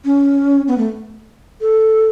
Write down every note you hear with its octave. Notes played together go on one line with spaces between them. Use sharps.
C#4
B3
A3
A4